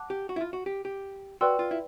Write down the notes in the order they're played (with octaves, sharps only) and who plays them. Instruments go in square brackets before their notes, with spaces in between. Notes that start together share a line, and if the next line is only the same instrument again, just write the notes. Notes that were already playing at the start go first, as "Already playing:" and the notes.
Already playing: [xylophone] F#5 A5 D6 F#6
[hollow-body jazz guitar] G4
F#4
E4
F4
F#4
G4
G4
[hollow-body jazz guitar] F#4 [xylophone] B4 D5 G5 C6 E6
[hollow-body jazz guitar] F4
E4